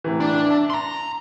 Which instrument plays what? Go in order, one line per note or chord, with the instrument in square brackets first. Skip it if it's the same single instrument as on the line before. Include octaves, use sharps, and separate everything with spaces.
[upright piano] A2 C3 E3
[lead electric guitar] D4
[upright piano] E5 A5
[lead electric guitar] A#5 C6